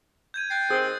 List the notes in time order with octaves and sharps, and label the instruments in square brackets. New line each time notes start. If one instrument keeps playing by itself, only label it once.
[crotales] G6 G#6 D#7
[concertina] G5 [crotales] F#6 A6 C7
[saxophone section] D#3 C4 [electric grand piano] G#4 [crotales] D#6